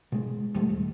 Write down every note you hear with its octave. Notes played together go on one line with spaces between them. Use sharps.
B2 G#3
D1 G3 A3
D#1